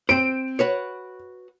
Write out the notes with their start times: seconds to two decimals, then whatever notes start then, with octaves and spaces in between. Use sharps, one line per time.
0.09 C4 C5 D7
0.59 F#4 B4 C#5